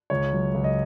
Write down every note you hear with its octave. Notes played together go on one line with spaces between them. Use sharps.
C#2 C#5
F#3
C#2
D#5